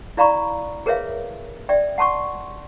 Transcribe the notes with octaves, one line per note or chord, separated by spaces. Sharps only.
E4 D5 F5 A#5 B5 C#6
G#4 A#4 B4 C#5 E5 F5
D5 E5 G5
F#5 A5 C6 C#6